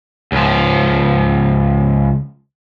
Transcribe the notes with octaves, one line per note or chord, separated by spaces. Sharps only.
C#2 F3